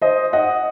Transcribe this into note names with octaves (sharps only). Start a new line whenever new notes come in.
C5 D#5
D#5 F#5